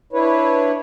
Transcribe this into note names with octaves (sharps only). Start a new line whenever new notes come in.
D4 E4 B4 C#5